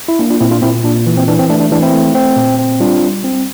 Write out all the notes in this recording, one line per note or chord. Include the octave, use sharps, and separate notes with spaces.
E4
A#3 D4
D4 F4
A#2 C4 E4
D4 F4
A#2 C4 E4
A#2 D4
E3
C4
E3 D4
C4
A3 D4
D4
E3 D4
C4 E4
A3
C4
A#2
C4
G3 D4 F4
G3
C4